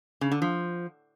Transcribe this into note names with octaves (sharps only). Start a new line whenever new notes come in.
C#3
D3
F3